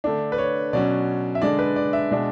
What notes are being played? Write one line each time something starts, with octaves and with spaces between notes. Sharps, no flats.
D3 A3 D4
B4
C#5
B2 F#3 C#4 D5
E5
D3 G#3 D4 D5
B4
D5
E5
B2 G#3 D4